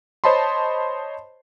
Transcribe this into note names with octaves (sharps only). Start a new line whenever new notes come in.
C5 C#5 D#5 A5 B5 C6